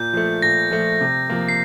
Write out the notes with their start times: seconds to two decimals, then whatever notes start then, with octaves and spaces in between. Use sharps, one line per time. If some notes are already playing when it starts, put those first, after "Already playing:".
Already playing: A#2 G6
0.13 F3 A3
0.42 A#2 A#6
0.71 F3 A3
1.01 C3
1.30 F3 A#3
1.48 C7